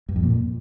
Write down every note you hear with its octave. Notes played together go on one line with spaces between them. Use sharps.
G2
F2
A#2